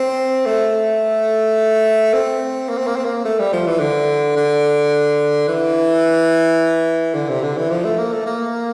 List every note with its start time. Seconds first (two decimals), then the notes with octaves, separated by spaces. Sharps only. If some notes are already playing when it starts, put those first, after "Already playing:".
Already playing: C4
0.46 A3
2.14 C4
2.69 A#3
2.78 C4
2.87 A#3
2.96 C4
3.05 A#3
3.25 A3
3.39 G3
3.53 F3
3.67 E3
3.80 D3
4.36 D3
5.48 E3
7.14 D3
7.29 C3
7.42 D3
7.57 E3
7.70 F3
7.84 A3
7.98 A#3
8.12 A3
8.26 A#3